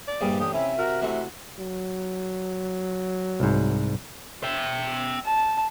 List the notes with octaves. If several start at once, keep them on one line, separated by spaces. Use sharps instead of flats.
D5
A#1 G2 G3 G#4
A1 D3 G4 D#6
C3 C#4 E4 E5
F#4 A#4
C3 E3 A3
F#3
C2 G#2
E5 G5
A5